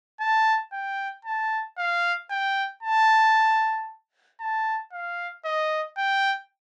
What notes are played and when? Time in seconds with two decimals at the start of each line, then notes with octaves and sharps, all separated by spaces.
0.20 A5
0.72 G5
1.25 A5
1.78 F5
2.30 G5
2.82 A5
4.40 A5
4.92 F5
5.45 D#5
5.97 G5